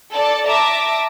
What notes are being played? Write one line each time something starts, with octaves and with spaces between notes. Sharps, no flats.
A4 D5 A5
E5 A5 A#5 D6